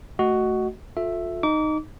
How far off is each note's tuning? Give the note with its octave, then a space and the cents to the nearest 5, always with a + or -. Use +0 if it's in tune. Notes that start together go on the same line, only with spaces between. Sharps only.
A3 +0 F#4 +10 D#5 +0
F4 +30 A4 -5 E5 +5
D#4 -10 D6 -35